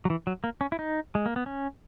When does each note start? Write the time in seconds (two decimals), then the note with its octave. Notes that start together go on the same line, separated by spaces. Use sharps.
0.05 F#3
0.10 E3
0.27 F#3
0.44 A#3
0.61 C#4
0.72 E4
0.79 D#4
1.15 G#3
1.26 A#3
1.36 B3
1.46 C#4